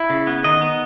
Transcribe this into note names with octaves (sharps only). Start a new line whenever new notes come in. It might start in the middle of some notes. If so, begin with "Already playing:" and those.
Already playing: E4
C#3
B3
D#3 D#5
B3